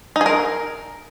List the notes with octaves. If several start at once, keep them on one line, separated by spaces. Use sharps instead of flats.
D#4
G#4
A#4